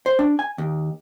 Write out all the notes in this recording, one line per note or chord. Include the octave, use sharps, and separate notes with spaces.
C5
D4
G#5
D#2